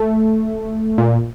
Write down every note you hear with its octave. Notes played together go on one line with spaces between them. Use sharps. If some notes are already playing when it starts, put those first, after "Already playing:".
Already playing: A3
A#2